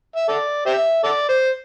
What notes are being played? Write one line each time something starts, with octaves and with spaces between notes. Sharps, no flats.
E5
A4 D5
G4 C5 E5
A4 D5
C5